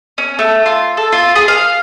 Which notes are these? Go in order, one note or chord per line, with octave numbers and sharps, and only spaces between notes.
C#4
A3
F4
A4
F4
G#4
F5